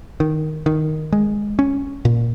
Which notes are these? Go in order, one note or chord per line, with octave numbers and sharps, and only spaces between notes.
D#3
D#3
G#3
C#4
A#2